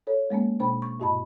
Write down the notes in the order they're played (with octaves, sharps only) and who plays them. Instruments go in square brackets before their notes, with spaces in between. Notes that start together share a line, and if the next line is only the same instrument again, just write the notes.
[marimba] A4 C#5
G#3 A#3 B3 C#4
B2 D4 C5 G5 B5
C#6
G2 A#2 F#4 D#5 A5 B5